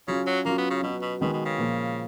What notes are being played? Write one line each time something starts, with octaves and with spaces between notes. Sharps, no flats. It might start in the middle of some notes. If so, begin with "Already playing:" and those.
C#3 F#3 C#4 F4
F#3
F#3 A#3 C#4 F4
B3
C#3
B2 F#3 B3 F#4
B2
B2 D#3 G#3 B3 F#4
B2
C#3
A#2 F3 A#3 F4